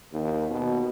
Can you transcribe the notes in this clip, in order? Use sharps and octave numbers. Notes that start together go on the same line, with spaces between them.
D#2
B2